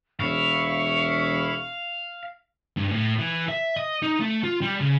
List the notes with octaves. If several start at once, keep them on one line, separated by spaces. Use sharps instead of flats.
E1 E4 F5 C#6
G2
A2
E3
E5
D#5
D#4
A3
F4
G3
C#3